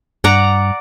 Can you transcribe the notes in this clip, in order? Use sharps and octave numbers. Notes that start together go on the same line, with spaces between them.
G2 D5 F#5 A#5